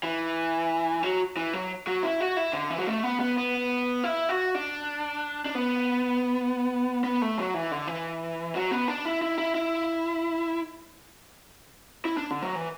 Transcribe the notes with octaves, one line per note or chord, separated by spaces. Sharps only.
E3
F#3
E3
F#3
F#3
E4
F#4
E4
D3
E3
F#3
A3
B3
B3
B3
E4
F#4
D4
D4
B3
B3
A3
F#3
E3
D3
E3
F#3
B3
D4
E4
E4
E4
E4
E4
D4
D3
F#3
E3